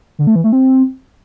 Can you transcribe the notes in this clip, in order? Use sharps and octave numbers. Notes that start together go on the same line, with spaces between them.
D3
A3
E3
A3
C4